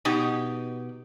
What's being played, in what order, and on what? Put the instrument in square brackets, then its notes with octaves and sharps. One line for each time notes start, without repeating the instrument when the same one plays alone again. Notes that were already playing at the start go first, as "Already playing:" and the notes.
[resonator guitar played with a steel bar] B2 D#4 G4